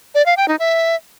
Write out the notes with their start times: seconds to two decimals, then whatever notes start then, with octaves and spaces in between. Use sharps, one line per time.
0.15 D5
0.26 F5
0.37 G5
0.48 D#4
0.59 E5